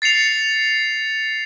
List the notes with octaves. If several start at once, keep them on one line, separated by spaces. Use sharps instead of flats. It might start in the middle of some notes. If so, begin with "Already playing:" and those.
A6 C7 C#7 F7